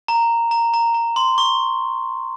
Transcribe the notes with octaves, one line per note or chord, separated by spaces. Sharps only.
A#5
A#5
A#5
A#5
C6
C#6